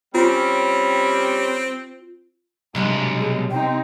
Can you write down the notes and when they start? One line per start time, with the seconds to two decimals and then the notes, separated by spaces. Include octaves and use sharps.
0.15 G3 C4 C#4 F4
2.75 B1 C3 G3 G#3 D4
3.20 G#4
3.51 C4 D#4 G5